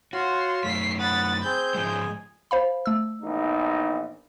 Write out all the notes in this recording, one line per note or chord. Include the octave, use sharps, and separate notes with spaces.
F4 F#4 C#5 C6
F#2 A3 B6 C7
F#5 B5 D#6 A6
C4 G#4 G6
G#2 F3 G#3 G#4
C5 F5 B5
A3 E6
A#1 E2 D#4